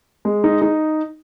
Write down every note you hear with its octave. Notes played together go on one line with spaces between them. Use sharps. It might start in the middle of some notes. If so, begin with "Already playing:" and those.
G#3
D#4
D#4